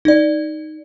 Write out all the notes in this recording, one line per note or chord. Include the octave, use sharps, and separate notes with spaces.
D#4 D5